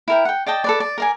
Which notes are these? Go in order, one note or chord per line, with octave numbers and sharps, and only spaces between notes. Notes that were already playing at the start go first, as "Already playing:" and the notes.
E4 A#4 G5
F#5 G5
D5 D#5 G5 A5
A4 B4 D5
D5
A#4 D5 G#5